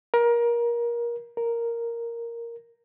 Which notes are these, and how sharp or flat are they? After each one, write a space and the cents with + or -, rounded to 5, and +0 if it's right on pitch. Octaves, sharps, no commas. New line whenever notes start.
A#4 +25
A#4 +0